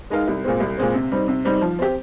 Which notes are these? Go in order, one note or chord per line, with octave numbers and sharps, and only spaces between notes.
G#3 D#4 A#4 F5
C2
A#2 G#3 C4
C2
A#2 G#3 C4
C3
G3 C4 D#4
C3
G3 C4 D#4
F3
C4 G4